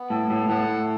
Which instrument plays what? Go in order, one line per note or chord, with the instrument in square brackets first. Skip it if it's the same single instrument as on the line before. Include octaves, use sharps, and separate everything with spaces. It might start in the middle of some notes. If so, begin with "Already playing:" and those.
Already playing: [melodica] B3
[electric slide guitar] A2 [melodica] A4
[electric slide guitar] A2
[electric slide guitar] A2 [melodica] F#5